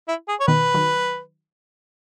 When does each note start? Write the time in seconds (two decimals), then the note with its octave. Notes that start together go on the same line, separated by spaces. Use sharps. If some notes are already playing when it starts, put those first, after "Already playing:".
0.08 E4
0.28 G#4
0.40 C#5
0.48 B2 D#3 B4
0.74 D#3 F#3